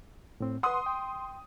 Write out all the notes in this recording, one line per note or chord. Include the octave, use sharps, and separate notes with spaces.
A2 C4
B4 F#5 C6 D#6
G5